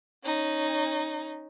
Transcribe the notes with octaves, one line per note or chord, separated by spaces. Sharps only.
C#4 D#4